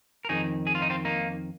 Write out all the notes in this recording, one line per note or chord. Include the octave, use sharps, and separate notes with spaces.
A#4
F2 D#3 D#4 G#4
G#4
F4
D#4
C4 F4
A#3 D#4